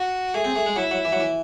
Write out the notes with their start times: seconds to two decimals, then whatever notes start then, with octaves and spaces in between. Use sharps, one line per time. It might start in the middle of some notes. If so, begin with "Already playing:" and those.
Already playing: F#4
0.34 A3 G#4
0.44 C4
0.56 A3
0.66 G#3
0.76 F#3 E4
0.91 F#3
1.05 E3
1.12 F#3
1.20 E3